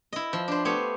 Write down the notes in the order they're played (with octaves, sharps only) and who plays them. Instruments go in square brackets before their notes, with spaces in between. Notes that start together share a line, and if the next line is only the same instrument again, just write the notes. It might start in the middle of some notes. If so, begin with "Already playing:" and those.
[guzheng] E4 D#5
F3
D4 C5
A3 B3 G4 C5 C#5